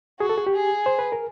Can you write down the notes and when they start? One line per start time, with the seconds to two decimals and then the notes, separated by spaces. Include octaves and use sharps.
0.20 F#4 G#4
0.29 A4
0.38 G#4
0.47 G4
0.55 G#4
0.86 C5
0.99 B4
1.12 A#4